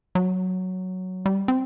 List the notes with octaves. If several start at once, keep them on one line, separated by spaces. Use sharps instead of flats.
F#3
G3
C4